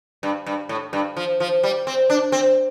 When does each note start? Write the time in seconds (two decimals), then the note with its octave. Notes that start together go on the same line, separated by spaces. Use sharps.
0.23 G2
0.46 G2
0.69 A2
0.93 G2
1.17 F3
1.40 F3
1.63 G3
1.87 C4
2.10 D4
2.32 C4